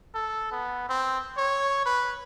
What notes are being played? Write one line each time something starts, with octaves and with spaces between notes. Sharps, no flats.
A4
B3
C4
C#5
B4